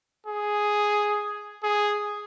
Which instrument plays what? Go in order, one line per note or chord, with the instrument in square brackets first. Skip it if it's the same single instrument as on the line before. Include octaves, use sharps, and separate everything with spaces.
[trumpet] G#4
G#4